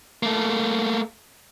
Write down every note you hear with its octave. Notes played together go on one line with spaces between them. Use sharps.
A3 A#3